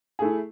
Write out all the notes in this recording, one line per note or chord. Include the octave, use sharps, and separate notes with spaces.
A3 E4 G#4